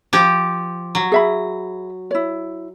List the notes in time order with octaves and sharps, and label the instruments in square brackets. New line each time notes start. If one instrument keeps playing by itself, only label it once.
[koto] F3 G4
F#3
[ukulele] G#4 E5 B5
E4 C#5